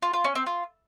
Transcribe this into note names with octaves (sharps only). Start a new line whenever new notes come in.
F4
F4
C#4
C4
F4